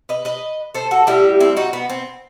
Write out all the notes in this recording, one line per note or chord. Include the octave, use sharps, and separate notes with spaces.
B4 D#5
B4 D#5
A4 C5
F#4 A4
A2 G3 E4 G4
C4 E4
D#4 F#4
B3
C4